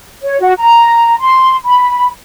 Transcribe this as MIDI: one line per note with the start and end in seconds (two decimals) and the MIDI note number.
0.23 0.39 73
0.41 0.52 66
0.59 1.16 82
1.20 1.55 84
1.65 2.08 83